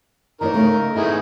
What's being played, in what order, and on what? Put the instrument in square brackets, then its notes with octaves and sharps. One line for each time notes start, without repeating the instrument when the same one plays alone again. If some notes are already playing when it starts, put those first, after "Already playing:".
[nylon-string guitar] E3 A#3 C#5 [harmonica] D#4 A#4
[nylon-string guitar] C#3 A3
[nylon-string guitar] D#3 B3 [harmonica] D#4 E4 G#4